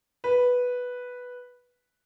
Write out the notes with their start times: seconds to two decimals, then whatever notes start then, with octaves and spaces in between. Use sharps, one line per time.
0.24 B4